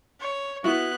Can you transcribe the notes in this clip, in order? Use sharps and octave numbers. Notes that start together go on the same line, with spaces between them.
C#5
B3 E4 F#4 F#6